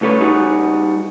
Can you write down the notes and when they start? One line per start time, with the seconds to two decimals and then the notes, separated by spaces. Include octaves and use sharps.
0.01 C#2 A2 A4 B4 C#5
0.21 G3 D#4 F#4 G#4